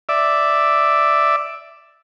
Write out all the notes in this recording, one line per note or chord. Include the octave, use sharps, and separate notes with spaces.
D5 E5